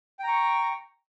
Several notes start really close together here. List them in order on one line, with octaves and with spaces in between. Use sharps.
G5 A#5 C#6